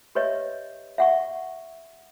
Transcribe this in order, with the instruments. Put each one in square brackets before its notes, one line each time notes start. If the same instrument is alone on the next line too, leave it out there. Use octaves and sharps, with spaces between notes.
[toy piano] G4 B4 C#5 D#5 E5
E5 F#5 C#6